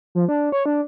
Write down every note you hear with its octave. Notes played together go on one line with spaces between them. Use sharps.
F3
D4
C#5
D4